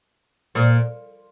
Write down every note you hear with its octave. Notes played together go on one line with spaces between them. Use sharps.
A#2